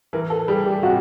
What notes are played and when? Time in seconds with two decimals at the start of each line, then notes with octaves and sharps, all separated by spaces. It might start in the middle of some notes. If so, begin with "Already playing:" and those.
0.13 E3 A#4
0.30 A4
0.48 G3 G#4
0.66 G4
0.83 C3 F#4